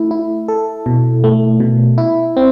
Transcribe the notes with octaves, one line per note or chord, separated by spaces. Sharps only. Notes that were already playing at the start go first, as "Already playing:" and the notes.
Already playing: A3 E4
E4
A4
B2
A3
B2
E4
C4